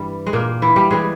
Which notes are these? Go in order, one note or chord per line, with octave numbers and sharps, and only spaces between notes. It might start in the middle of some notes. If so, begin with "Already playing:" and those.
Already playing: G2 E3 G3
G#3
A#2 A#3
E3 E4
G3 G4
E3 G3 G#3 G#4